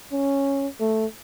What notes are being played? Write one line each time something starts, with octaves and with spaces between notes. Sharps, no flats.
C#4
A3